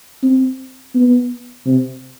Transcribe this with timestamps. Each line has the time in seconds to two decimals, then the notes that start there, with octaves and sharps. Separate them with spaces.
0.23 C4
0.94 B3
1.66 C3